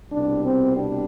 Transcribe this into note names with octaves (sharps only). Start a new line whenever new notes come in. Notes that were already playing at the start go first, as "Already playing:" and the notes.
C2 B2 G3 D4
C4
D4